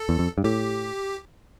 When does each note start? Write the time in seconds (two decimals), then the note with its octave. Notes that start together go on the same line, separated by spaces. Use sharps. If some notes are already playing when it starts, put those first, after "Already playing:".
Already playing: A4
0.09 E2
0.19 F2
0.38 G2
0.44 A2 G4